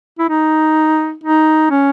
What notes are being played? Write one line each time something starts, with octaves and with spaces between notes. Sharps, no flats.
E4
D#4
D#4
C#4